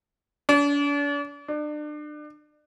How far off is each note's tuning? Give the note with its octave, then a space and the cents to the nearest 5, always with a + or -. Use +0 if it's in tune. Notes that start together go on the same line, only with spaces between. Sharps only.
D4 -40
D4 +35